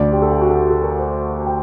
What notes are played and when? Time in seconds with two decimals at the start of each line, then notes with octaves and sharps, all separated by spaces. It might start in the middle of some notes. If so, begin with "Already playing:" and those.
Already playing: D2 D3 D5
0.12 G4
0.22 A4
0.31 G4
0.41 F#4
0.50 A4
0.55 G4
0.70 A4
0.84 A#4
0.98 C5
1.46 G5